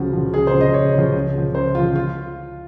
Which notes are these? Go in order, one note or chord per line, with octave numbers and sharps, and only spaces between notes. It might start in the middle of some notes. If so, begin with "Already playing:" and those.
Already playing: C#2 C#3 F3 F#4
C#3 F3
C#2 G#4
C5
C#3 F3
D#5
C#2 C#5
C#3 F3
C#2
C#3 F3
C#2 C5
C#3 F3 F4
F4